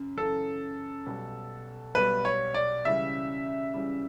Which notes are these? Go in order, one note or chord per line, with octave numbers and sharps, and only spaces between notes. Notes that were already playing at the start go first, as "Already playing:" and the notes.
Already playing: F#2 C#3
F#2 C#3 E3 A4
B1 B2 G3
B1 B2 G3 B4
C#5
D5
C#2 C#3 E3 G3 E5
C#2 C#3 E3 G3